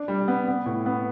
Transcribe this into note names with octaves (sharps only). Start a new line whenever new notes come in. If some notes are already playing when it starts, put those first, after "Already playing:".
Already playing: D4
G3
B3
B3
A2
B3